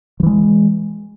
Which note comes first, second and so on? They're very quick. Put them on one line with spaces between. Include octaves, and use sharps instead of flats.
F3 E3 G#3